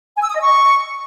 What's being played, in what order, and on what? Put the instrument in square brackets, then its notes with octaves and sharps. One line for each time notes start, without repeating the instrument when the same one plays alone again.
[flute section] G#5
E6
D#6
D#5
C#6